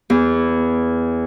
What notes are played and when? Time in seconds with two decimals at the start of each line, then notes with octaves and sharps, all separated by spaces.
0.10 E2